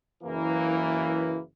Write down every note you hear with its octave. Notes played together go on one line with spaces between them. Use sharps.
F#1 E3 A#3